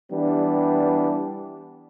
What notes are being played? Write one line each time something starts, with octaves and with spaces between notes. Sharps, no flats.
E3 G3 B3 D4